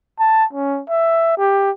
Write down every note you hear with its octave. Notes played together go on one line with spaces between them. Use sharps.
A5
C#4
E5
G4